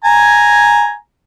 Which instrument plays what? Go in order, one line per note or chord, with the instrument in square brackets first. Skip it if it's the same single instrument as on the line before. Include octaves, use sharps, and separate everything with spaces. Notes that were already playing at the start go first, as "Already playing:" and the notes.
[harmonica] G#5 A#5